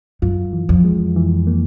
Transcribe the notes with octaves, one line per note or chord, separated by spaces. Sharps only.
F#2 F4
E3
F2
G#3
E3
A#3